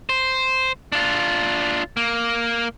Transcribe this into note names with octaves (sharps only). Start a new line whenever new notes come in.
C5
D4 F4
A#3